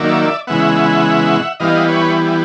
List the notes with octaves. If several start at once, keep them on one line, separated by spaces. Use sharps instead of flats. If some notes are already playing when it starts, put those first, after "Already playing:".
Already playing: D#3 F#3 A#3 D5 E5
C#3 E3 G#3 B3 E5 F#5
E3 G3 B3 D#5 F5
B4 C#5